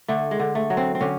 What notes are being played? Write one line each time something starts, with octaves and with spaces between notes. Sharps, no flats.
D3 A3
G#3
D3
A3
F#3
C4
C4
D3 C#4